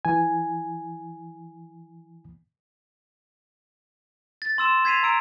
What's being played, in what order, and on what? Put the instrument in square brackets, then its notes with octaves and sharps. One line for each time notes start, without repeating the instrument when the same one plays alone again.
[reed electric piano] E3 G#5
[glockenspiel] A6
C6 E6 E7
G#6 B6 C7 D#7 F7
A#5 E6 D7